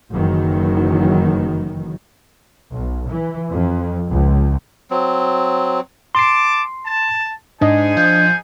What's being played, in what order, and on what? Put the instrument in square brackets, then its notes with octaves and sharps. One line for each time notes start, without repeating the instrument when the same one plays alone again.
[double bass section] F#1 D#3 E3 F#3
B1
E3
F2
C#2
[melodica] F#3 C4
[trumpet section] A5 D6 [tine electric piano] C6 C7
[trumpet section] A5
[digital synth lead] G#2 [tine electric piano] D4 D#5 [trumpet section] D#4 G#4 G#5
[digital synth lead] F3 [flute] G6